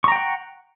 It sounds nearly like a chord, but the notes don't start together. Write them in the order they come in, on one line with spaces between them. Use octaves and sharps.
C#6 A#5 G5 F#5